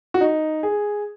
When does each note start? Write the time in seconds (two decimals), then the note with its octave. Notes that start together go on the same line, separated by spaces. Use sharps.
0.14 F#4
0.21 D#4
0.63 G#4